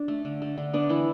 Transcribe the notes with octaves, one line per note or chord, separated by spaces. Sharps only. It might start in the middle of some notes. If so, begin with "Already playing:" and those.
Already playing: D4
A3
D3
A3
D3
B3 D4
E3 E4